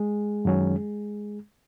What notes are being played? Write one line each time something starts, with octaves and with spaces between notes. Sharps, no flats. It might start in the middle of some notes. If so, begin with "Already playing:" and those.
Already playing: G#3 G#4
F#2 D#3 F#3 C#4